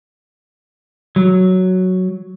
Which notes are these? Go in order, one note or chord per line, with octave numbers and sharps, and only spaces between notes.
F#3